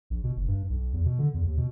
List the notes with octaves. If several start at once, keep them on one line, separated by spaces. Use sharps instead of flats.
A#1
B2
F#1
G2
B1
E2
B2
D3
E2
D#2
B2